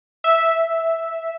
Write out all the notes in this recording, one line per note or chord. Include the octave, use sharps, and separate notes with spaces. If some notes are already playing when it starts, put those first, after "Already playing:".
E5